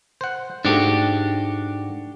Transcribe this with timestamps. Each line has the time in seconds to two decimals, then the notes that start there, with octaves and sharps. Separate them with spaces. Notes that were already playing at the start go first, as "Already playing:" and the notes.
0.21 C5 F#5
0.65 G#2 A3 D4 F#4 G4